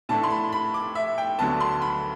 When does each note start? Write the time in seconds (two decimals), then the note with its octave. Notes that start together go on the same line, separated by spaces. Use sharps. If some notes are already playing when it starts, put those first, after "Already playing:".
0.09 A2 E3 A3 D4 A5
0.23 C6
0.30 B5
0.52 B5
0.74 D6
0.95 E5
1.18 G5
1.38 D2 D3 F#3 B3 A5
1.60 C6
1.82 B5